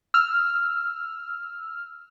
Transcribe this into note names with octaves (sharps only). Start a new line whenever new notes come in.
E6 F6